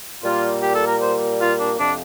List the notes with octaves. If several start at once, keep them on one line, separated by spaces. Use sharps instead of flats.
A#2 G3 A#3 F4
G4
A4
A#4
C5
F4
D4
F2 C3 F3 D4